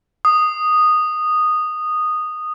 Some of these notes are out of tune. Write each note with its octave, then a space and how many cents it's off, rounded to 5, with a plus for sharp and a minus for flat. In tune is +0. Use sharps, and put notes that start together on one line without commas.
D#6 -10